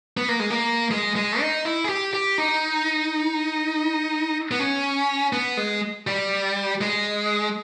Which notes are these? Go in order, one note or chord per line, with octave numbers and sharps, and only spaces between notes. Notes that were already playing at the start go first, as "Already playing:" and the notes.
B3
A#3
G#3
A#3
G#3
G#3
D#4
E4
G#4
G4
G4
D#4
B3
C#4
B3
G#3
G3
G#3